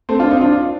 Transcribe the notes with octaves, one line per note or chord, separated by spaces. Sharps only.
A3 C4
D4 F4
C4 D#4
D4 F4